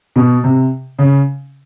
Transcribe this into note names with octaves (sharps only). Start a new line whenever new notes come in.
B2
C3
C#3